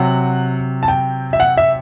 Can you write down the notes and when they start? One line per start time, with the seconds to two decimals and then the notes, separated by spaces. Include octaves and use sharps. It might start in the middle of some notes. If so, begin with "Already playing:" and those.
Already playing: C3 F#3 F#5
0.83 A5
0.88 G5
1.33 E5
1.40 F#5
1.57 E5